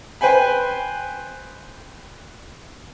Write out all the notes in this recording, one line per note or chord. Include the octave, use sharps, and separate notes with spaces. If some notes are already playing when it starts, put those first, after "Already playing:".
B4 C5 G5 G#5 B5